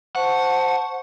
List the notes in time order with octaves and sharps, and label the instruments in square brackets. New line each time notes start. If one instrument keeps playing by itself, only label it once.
[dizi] C5 [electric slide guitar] F#5 [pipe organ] A5 C#6